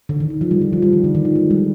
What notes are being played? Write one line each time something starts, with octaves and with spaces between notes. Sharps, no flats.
D3
D#3
D3
F3
G3
F3
F3
G3
D#3
D3
D#3
F3
G#3
G3